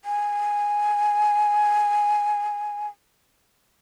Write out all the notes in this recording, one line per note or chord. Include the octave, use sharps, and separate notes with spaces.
G#5